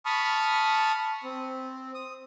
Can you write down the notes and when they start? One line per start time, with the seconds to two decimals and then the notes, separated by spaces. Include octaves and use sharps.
0.06 A5 B5 C#6 D#6 F6
1.24 C4
1.95 D#6